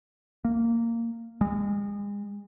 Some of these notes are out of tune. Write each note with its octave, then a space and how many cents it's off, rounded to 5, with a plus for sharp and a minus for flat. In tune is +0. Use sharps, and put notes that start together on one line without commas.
A#3 -15
G#3 -35